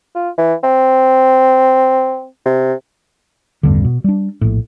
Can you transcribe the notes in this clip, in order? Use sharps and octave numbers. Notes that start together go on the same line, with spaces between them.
F4
E3
C4
C3
A1 E2 G2 D3
B2
G3 D4
A#1 A2